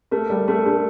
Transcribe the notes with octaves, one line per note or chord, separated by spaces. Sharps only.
A3 A#4
G3 A#4
A3 A#4
A3 D4